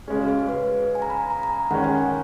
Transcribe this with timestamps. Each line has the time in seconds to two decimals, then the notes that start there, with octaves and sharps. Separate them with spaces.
0.08 C#3 G#3 C#4 G#4
0.19 F#4
0.28 G#4
0.39 G#4
0.49 B4
0.95 G#5
1.02 A#5
1.10 B5
1.30 A#5
1.43 A#5
1.71 D#3 G#3 C#4 F#5
1.84 G#5
1.98 F#5